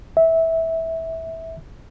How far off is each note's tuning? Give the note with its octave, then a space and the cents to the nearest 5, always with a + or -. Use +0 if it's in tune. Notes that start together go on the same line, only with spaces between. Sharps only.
E5 -15